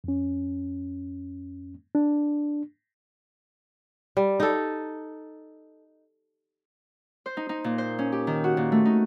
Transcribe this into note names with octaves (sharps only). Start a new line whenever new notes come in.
F2 C#4
D4
G3
D#4 A4
C5
D#4
D#4
A#2
C5
C#4
G4
D#3
F#4
A#2
A3
D#4